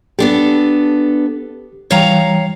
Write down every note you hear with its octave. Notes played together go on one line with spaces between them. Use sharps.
B3 D4 G4 A4
E3 G3 C#5 F5 G5 A#5